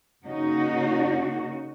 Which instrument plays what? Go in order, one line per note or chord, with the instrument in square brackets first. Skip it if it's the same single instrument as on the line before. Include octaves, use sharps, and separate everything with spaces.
[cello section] C#3 A#3 C#4 D#4 F#4